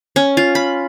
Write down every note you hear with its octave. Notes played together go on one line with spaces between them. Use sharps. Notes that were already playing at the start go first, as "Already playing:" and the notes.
C#4
F4
B5